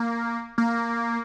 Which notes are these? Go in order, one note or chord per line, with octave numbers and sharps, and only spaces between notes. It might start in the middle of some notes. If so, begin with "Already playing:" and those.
Already playing: A#3
A#3